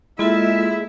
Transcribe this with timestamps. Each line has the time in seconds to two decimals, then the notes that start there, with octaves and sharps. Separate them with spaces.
0.19 G#3 A#3 E4 F4 A4 E5